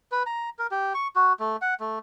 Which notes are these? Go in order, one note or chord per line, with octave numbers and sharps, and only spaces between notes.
B4
A#5
A#4
G4
C#6
F#4
A3
F#5
A3